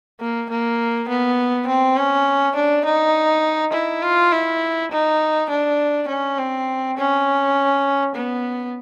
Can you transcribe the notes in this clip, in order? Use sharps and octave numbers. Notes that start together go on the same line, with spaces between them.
A#3
A#3
B3
C4
C#4
D4
D#4
E4
F4
E4
D#4
D4
C#4
C4
C#4
B3